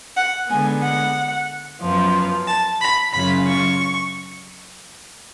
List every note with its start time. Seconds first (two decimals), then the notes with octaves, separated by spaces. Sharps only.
0.17 F#5
0.50 D3 G#3 B3 G#5
0.82 F#5
1.82 F#2 F3 B3 F4
2.47 A5
2.81 B5
3.13 F#2 C#3 F#3 C#4 F4 B5
3.47 C#6